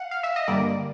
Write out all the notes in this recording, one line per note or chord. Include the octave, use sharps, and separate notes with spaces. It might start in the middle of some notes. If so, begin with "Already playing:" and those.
Already playing: F5 F#5
F5
E5
D#5
G2 D3 G3 A#3 D5